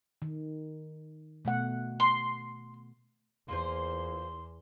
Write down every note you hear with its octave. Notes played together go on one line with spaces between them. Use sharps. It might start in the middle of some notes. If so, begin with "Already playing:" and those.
D#3
B2 A3 F#5
C6
E2 A#3 F4 C5 C6